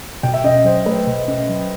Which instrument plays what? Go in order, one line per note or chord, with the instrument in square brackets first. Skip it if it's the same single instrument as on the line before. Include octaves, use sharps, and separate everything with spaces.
[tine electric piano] B2 [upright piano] G5
[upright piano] E5
[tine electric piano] C#4 [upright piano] D#5
[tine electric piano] F#3 [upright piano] C5
[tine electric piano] A3 [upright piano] B4
[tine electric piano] B2
C#4
F#3